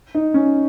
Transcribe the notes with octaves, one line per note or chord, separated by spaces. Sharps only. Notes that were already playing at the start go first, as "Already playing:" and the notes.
D#4
C#4